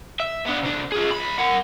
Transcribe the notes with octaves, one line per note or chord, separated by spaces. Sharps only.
E5
B3 D4
C3 D4
F4 G#4
B1 B5
A#4 F#5